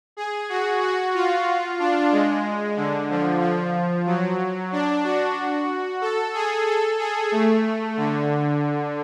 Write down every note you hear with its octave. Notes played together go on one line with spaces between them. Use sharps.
G#4
F#4
F#4
F4
D4
G#3
D3
F3
F3
F#3
D4
F#4
A4
G#4
A4
G#4
A3
D3